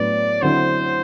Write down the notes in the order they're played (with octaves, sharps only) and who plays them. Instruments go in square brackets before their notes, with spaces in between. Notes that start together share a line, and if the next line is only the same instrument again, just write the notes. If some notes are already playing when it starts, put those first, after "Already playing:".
Already playing: [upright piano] A2 F#3 B3 D4 [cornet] D5
[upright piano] D3 F#3 C4 E4 [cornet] C5